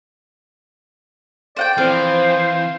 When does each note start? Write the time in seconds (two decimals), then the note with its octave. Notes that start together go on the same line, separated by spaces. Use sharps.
1.57 C5 D5 F#5 G5
1.78 E3 F3 C4 C5 F5